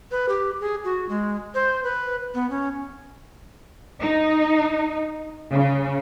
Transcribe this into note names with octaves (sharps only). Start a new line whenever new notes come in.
B4
G4
G#4
F#4
G#3
C5
B4
B3
C#4
D#4
C#3